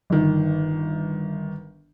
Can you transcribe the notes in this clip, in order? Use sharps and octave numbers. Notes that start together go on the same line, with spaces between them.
G1 D#3